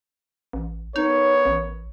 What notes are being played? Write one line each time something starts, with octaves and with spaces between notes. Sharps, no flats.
A1
B3 D#4 A#4 C#5
A1